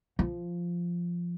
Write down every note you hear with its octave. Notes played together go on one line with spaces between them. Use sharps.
F3